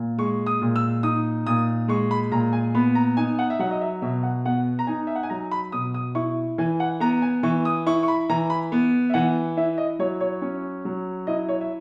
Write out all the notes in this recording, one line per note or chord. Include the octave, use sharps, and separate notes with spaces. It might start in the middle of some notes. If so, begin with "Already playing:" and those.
Already playing: A#2
G#3 C#6
D#6
A#2
E6
D#4 D#6
A#2 D#6
G#3 C#6
B5
A#2 A#5
G#5
B3 B5
A#5
D#4 G#5
F#5
E5
F#3 F#5
D#5
E5
B2 E5
F#5
B3 F#5
A#5
D#4 G#5
E5
F#5
G#5
F#3 A#5
B5
B2 D#6
D#6
E4 C#6
E3 G#5
F#5
B3 A#5
G#5
E3 C#6
D#6
E4 C#6
C#6
B5
E3 A#5
B5
B3
E5
E3 F#5
E4 E5
D#5
F#3 C#5
C#5
C#4
F#3
E4 D#5
C#5
E5